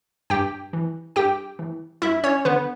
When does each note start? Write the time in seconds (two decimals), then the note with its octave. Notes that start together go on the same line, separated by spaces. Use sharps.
0.30 G2 G4 G5
0.73 E3
1.16 G2 G4 G5
1.59 E3
2.02 G2 E4 E5
2.24 C#4 C#5
2.45 D3 B3 B4